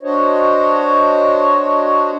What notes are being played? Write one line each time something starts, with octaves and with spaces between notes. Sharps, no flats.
D4 F#4 C5 C#5 D#5